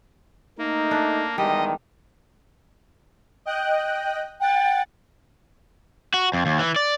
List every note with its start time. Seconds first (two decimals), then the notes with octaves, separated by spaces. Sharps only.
0.59 A3 A#3 D#4
0.91 D4
1.38 E2 D#3 G3 G#3 D#5
3.45 D#5 G5 F#6
4.40 F#5 G5 A6
6.14 F#4
6.33 F2
6.46 D#2
6.59 E3
6.76 D5